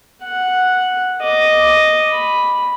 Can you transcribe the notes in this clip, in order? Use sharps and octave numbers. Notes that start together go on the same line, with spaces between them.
F#5
D#5 D6
B5